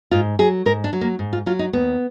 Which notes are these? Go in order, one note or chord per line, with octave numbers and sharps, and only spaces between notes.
G#2 F4
F#3 G#4
G#2 A#4
D4
F#3
A#3
G#2
F4
F#3 F4
D#4
D#2 B3